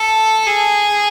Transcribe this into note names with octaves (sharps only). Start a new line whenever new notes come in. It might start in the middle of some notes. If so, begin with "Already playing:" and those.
Already playing: A4
G#4